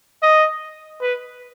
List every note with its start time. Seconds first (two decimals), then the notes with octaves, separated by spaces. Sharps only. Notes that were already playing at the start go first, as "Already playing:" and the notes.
0.23 D#5
1.01 B4